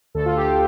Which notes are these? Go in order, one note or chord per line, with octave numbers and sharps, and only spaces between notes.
D2 A4
F4
G4